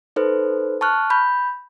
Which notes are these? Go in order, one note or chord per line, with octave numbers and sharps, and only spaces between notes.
D#4 A4 B4 C5
A5 C#6 F6 F#6
B5 G6